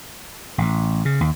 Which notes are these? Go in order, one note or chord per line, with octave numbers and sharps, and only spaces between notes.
A1
C#3
D#2